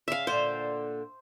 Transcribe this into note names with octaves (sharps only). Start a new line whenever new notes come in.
C#3 C#4 E5 F5
A#2 D3 C5